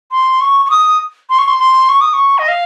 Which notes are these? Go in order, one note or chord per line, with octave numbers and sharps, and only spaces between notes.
C6
C#6
C#6
D#6
C6
C#6
C6
C6
C#6
D#6
C#6
D#5
F5